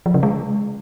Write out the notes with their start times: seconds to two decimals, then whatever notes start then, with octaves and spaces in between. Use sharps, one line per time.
0.06 F3
0.14 C#3
0.23 G#3